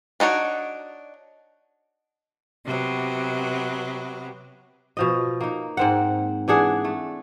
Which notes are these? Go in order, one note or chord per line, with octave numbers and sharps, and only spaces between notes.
D4 D#4 F#4 C#5
C3 F#3 B3
B2 F3 D#5
A#3 D#4
G#2 C4 F#5
E3 D4 G#4 F#5
A3